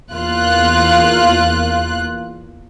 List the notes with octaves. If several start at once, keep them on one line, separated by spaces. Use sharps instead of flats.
E2 A#3 F4 F#6